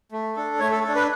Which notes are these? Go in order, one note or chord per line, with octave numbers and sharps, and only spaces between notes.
A3
D4 A4
A3 C#5
A4
A4
D4
B4